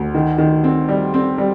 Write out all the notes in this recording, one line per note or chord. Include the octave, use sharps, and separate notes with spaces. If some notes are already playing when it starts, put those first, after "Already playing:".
Already playing: D2
D#3
D#3
C4
G3
C4
G3